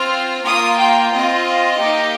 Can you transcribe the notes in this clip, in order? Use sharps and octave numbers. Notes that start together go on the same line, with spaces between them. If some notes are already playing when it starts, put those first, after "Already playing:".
Already playing: C4 F4 F6
A#3 F4 D#6
G5
C4 F4 D#5
A#3 D#4 G4